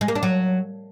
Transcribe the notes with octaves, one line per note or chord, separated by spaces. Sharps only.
G#3
A#3
D4
F#3